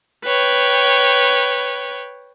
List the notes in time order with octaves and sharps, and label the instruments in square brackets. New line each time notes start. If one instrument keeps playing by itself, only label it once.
[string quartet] B4 C#5 G5